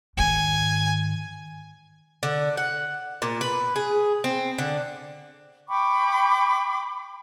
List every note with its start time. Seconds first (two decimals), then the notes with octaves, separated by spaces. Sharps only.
0.17 G#2 D#3 G#5
2.23 D3
2.57 F#5
3.22 A#2
3.41 B4
3.76 G#4
4.24 C4
4.58 D3
5.69 G5 B5 C#6 D6